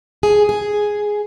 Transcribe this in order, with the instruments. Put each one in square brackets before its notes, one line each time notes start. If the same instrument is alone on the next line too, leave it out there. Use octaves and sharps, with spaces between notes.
[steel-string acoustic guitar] G#4
G#4